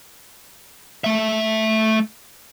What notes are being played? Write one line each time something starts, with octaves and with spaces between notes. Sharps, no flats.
A3 E5